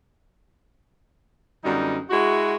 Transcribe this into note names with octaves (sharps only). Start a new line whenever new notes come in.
F#2 D3 G3 B3 D#4
G#3 E4 F#4